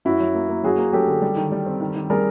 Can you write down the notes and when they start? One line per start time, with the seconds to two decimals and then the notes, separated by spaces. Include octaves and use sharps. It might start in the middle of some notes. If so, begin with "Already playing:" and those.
0.05 F#2 E4 F#4
0.20 F#3
0.35 A#3
0.49 A#3
0.63 F#3 F#4 G#4
0.78 A#3
0.93 F#3 G4 A4
1.07 D3
1.22 G3
1.36 D#3
1.52 G3
1.66 C4
1.81 D#3
1.96 D#3
2.10 G3 G#4 A#4